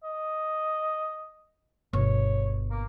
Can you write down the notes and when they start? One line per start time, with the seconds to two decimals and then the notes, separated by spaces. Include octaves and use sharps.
0.03 D#5
1.93 G1 B2 C#5
2.71 A#3